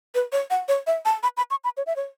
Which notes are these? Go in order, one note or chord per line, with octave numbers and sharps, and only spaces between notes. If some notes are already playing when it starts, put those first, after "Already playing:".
B4
C#5
F#5
C#5
E5
A5
B5
B5
C#6
B5
C#5
E5
C#5